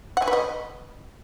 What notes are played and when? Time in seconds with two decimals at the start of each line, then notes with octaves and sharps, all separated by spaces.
0.17 F#5
0.22 G#5
0.28 B4
0.33 D#5